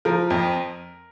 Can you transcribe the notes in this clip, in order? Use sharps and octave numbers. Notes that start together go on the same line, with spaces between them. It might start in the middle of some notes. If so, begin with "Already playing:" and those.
F3 A#4
F2